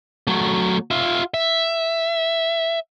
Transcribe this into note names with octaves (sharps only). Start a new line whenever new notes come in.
F#3 A3
F4 E5
E5